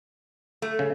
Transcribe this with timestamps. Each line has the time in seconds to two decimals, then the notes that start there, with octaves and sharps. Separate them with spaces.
0.62 A3
0.79 C#3